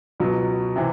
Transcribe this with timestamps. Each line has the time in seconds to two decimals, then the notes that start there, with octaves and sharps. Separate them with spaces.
0.20 C#2 B2 F#3
0.76 C3 E3